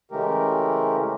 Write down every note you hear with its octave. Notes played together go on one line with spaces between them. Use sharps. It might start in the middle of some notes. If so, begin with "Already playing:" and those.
C#3 E3 G#3 A3 G4 A#4